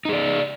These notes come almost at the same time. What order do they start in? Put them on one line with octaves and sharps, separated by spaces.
D#4 G#4 D5